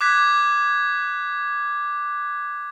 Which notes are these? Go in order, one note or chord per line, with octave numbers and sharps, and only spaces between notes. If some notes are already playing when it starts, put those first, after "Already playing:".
D6 F#6 G#6 B6